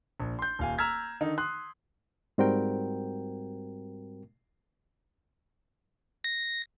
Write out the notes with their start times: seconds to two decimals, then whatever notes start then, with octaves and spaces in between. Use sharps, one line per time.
0.20 A#1
0.39 C6 G6
0.59 D#1 F5 G#5
0.78 A#5 E6 F6 G#6 B6
1.21 D3 D#3 D#4
1.38 C6 D#6 F#6
2.38 G#2 G3 C4 F#4 A#4 G5
6.24 A#6